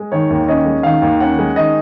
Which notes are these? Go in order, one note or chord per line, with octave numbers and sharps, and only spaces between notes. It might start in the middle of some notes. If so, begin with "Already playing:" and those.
Already playing: G#3
D#3 C#5
D#2
C#4 D#5
G#3
D#3 F5
D#2
C#4 F#5
G#3
D#3 D#5